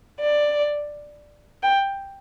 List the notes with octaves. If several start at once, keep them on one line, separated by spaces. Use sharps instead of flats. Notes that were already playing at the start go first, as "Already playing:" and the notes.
D5
G5